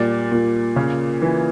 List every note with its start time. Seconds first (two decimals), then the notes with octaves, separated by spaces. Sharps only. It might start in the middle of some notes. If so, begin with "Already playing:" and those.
Already playing: A#2 G3 D5
0.32 A#2
0.76 C#3
1.22 E3